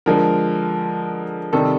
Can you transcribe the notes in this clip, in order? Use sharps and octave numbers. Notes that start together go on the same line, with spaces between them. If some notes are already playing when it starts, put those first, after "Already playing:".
D3 F3 G#3 A#4
C3 D#3 G3 A4